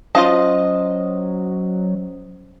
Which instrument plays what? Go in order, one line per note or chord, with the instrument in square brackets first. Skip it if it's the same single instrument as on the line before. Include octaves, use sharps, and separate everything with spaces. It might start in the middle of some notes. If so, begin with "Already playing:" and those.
[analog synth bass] F#3 [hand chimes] C#4 C5 [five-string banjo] F4 F5 A5 [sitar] D#5